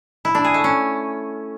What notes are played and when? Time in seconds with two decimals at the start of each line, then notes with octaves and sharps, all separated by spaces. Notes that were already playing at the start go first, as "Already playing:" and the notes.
0.25 E4
0.35 D4
0.44 G#4
0.54 A3
0.64 C#4